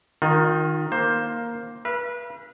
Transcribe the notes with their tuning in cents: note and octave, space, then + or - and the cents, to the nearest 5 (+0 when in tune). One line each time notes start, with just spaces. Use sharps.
D#3 +0 F4 +40
A#3 +5 C5 +10
B4 -30 F5 -45